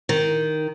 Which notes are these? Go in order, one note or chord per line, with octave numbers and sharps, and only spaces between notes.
D#3